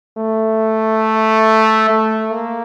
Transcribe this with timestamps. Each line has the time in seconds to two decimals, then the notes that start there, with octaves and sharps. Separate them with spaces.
0.17 A3
1.90 A3
2.32 A#3